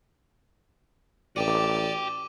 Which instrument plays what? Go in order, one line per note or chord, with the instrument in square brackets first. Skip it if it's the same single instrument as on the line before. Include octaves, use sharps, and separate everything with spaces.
[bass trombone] A1 [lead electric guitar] F#4 G5 [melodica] D5 [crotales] D6 D#7